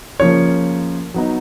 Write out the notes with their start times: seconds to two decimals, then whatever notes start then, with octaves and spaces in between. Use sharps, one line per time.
0.20 C#3 F3 A#3 C#4 C#5
1.14 F#3 B3 D#4